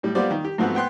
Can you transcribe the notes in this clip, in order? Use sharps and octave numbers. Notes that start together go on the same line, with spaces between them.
A2 G3
G3 A#3 B3 F4 C5 D5
D#3
G4
G#2 F3 A3 B3 C4 F#4
B3 G5 C6 F#6